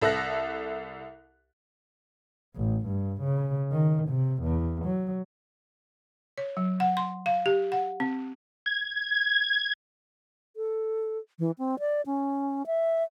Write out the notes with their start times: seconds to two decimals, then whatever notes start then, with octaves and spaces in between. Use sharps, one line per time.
0.02 C2 A4 E5 F#6 A#6
2.56 A1
2.86 G2
3.21 C#3
3.71 D#3
4.08 C3
4.42 E2
4.85 F#3
6.38 C#5
6.57 F#3
6.80 F#5
6.97 C6
7.26 F5
7.46 G4
7.72 F#5
8.00 C4
8.66 G#6
10.56 A4
11.39 E3
11.58 C4
11.79 D5
12.06 C#4
12.66 E5